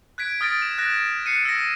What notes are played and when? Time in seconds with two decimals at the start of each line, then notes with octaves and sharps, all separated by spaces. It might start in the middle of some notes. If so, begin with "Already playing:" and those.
0.18 F#6 G#6 B6 D7
0.41 D#6 F6 A6 A#6 D7
0.62 E7
0.78 F#6 A#6 E7
1.26 F#6 C7 C#7 D#7
1.45 E6 A#6